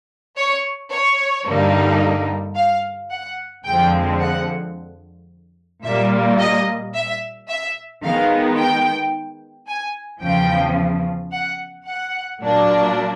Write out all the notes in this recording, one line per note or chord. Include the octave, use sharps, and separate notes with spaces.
C#5
C#5
G2 D3 G3 A#3 D#4
F5
F#5
F2 D3 F3 G#3 C4 G5
F#5
A#2 G3 A#3 E5
D#5
E5
E5
D#3 G#3 B3 D#4 F5
G5
G#5
E2 C#3 F3 G5
F#5
F#5
A#2 F#3 A#3 D4